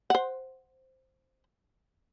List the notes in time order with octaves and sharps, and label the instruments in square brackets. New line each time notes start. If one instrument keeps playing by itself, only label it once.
[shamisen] C5 F#5